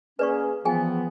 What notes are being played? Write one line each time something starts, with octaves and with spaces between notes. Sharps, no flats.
A#3 C#4 G#4 B4 D5 C#6
E3 F3 B3 G#4 G5 G#5